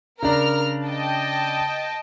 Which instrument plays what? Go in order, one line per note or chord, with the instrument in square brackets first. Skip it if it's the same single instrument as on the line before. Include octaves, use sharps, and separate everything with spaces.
[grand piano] C#3 D4 [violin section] A#4 A#5 F6
[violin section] D#5 G5 A5